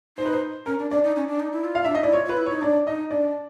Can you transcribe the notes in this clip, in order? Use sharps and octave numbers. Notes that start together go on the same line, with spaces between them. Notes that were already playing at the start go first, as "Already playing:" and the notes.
D#4 C5
B4
C5
C#4 A#4
D4
D4 D5
D#4
C#4
D4
D#4
E4
F4
F5
D4 E5
D#4 D#5
E4 D5
F4 C#5
F4
B4
E4
D#4 C#5
D4 D5
D#4 D#5
D4 D5